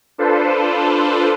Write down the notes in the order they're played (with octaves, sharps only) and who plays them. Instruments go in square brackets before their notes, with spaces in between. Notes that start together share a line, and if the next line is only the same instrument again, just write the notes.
[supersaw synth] D4 F4 A4 B4 C5